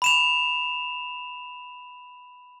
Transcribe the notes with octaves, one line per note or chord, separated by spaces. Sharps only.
B5 E7 F7